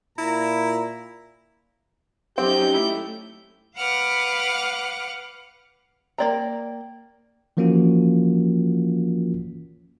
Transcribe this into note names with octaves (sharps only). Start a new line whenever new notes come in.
A#2 E4 A#5
F#3 C4 C#4 D#4 G4 G6
A3 E4
B4 F5 F#5 D6 F6 F#6
A#3 E4 D5 G5 A#5
E3 F3 A#3 C#4 F4 F#4